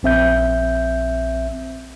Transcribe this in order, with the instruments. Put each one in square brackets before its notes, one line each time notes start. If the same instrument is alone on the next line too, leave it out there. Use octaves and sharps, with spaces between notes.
[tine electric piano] A#1 C4 E5 G6